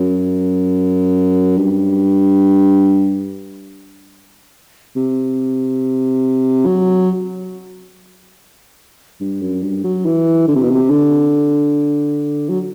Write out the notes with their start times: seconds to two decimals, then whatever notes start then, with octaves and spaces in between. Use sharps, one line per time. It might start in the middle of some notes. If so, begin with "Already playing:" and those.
Already playing: F#2
1.57 G2
4.96 C3
6.66 F#3
9.20 G2
9.41 F#2
9.62 G2
9.84 F#3
10.05 E3
10.48 D3
10.55 C3
10.63 B2
10.70 C3
10.90 D3
12.49 F#3